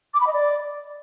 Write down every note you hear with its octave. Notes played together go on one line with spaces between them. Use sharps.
D6
B5
D#5
D5